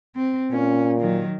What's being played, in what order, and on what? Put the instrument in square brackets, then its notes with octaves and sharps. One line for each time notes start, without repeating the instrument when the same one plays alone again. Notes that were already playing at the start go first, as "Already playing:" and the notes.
[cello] C4
[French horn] A#2 [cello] C#4
[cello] D#3 F#3